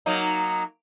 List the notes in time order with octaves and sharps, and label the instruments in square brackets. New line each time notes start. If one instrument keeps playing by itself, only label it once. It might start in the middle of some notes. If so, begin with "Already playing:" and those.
[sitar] F#3 A#3 D#4